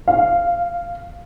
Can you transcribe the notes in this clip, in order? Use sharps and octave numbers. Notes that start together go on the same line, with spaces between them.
F5